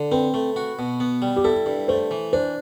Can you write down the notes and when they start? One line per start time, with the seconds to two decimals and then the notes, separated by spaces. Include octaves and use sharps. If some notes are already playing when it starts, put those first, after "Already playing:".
Already playing: D3
0.12 C4 B4
0.34 A3
0.56 F#4
0.79 B2
1.00 B3
1.22 G3
1.36 G4
1.44 E4 A4
1.66 G2
1.88 A3 C5
2.11 E3
2.33 D4 C5